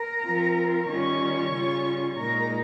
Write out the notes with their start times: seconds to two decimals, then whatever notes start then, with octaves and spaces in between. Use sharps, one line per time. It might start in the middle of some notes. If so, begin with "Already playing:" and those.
Already playing: A#4 A#5
0.22 F3 C4 F4
0.87 D#3 G3 C#4 F4 C#5 C#6
1.52 C#3 G3 C#4 F4
2.18 A#2 G#3 D#4 A#4 A#5